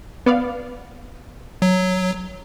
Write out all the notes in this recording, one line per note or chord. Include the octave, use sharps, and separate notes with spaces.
B3 D5 F5
F#3